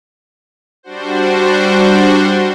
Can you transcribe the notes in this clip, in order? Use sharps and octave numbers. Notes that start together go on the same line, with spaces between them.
G3 D4 F#4 C5